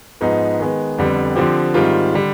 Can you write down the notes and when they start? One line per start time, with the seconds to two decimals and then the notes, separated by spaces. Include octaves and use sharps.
0.21 G#2 F3 B3 D#4
0.60 D#3 G#3 B3
0.98 F2 D3 G3 B3
1.36 D3 F3 C4 G4
1.74 G#2 D#3 G3 C4 F4
2.14 D3 G3